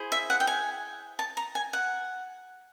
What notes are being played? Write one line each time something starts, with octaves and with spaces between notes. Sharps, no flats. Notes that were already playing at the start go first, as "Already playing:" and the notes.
Already playing: E4 G#4 C5
E5
F#5
G5
G#5
A5
A#5
G#5
F#5